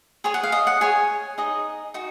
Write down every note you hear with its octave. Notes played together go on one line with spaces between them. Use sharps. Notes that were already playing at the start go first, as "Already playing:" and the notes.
G#4 C#5 G#5
F#5
F5
D#5
F#5
G#4 C#5 G#5
D#4 G#4 D#5
D#4 F#4